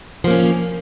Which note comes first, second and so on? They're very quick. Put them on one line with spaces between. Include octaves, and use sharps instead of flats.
F3 A#3 C#4